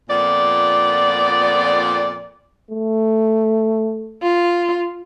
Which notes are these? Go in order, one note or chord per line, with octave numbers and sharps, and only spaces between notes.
F2 A#2 B3 D5
A3
F4